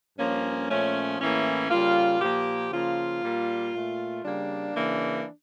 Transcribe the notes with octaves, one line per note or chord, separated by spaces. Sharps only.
G2 F3 A#3 C#4
A#2 F3 A3 C#4
A2 E3 A#3 C#4
C#3 G3 A#3 F4
A#2 F3 A#3 G4
C#3 F3 A#3 F4
A#2 G3 A#3
A#2 A3
C#3 G3 A#3 D4
C#3 E3 A#3